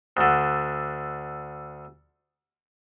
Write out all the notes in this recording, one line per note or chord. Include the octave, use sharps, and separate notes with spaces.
D2 D3